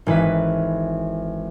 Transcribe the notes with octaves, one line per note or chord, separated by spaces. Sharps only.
G#1 E3 B4 B6